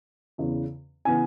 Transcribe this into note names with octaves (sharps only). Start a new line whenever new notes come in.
E2 C#3 E3
C#3 E3 B3 G#5